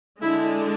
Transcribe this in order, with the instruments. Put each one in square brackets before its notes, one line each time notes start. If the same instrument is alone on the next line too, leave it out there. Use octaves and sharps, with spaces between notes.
[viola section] D3 G#3 D4 E4